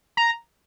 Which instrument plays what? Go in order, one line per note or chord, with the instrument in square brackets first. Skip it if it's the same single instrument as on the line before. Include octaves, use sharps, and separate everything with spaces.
[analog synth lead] A#5